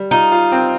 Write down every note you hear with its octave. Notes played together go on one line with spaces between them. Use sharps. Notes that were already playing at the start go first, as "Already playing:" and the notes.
Already playing: G3
D#4 F4
F4
C4